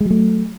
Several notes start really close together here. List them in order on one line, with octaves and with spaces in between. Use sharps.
G#3 F#3 A3